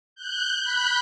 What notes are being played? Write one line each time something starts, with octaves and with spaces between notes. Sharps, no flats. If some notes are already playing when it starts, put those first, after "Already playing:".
F#6 G6
B5 F#6 G6